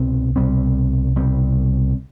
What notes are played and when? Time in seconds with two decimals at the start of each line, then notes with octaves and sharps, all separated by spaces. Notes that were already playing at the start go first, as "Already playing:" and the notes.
Already playing: C2 B2 C4
0.36 C2 B2 G3 C4
1.16 C2 B2 G3 C4